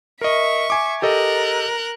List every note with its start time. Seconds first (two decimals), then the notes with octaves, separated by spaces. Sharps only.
0.21 A#4 D#5 E5 C#6
0.70 G#5 D6
1.02 G4 A4 A#4 D#5 F#6